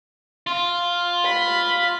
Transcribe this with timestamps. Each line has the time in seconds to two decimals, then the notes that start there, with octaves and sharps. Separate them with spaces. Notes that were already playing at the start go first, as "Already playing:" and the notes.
0.47 F4
1.25 B5